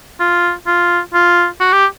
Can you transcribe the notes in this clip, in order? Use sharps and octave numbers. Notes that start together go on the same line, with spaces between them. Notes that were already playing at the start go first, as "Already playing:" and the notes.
F4
F4
F4
F#4
G4